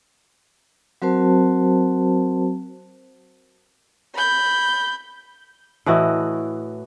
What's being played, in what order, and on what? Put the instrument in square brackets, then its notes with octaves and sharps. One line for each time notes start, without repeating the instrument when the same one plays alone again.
[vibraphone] F#3 C4 F#4 A#4 C5 A5
[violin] B5 G6
[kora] A2 E3 F#4 D#5